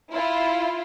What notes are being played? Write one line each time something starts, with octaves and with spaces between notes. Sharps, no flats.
E4 F4